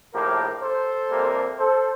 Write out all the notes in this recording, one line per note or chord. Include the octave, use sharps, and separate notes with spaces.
A#1 A2 F3 A#3 G4 A#4
A4 C5
F2 C3 G3 A#3
A4 C5